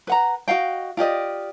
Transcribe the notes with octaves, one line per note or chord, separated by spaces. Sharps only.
B4 F#5 A#5
F#4 D#5 F5 G5
F4 G4 D5 D#5